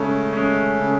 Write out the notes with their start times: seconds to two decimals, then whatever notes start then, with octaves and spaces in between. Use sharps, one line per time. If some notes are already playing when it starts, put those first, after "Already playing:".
Already playing: C#3 G#3 A3 C#4
0.33 G#3 C#4
0.80 C#3